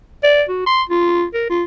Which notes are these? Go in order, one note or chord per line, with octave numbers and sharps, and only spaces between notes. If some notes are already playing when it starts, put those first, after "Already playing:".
D5
F#4
C6
F4
A#4
F4